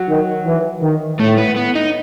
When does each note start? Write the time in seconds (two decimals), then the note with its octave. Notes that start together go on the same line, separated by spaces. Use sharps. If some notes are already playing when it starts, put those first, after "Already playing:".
Already playing: F#3
0.08 D#3
0.45 E3
0.82 D#3
1.19 A2 A3
1.38 B3
1.56 B3
1.76 D#4